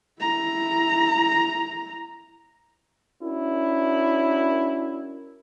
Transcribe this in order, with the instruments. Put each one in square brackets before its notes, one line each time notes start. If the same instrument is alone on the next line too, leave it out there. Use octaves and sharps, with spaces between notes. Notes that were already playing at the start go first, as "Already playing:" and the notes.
[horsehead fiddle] E4 A#5
[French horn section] C#4 D4 E4 F#4 A#4